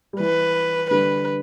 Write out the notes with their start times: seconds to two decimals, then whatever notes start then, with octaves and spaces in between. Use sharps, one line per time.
0.13 G3
0.20 E3 B4
0.91 D3 G3 B4